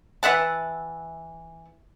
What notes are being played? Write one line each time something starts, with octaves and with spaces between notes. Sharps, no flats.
E3 E5 F#5 A5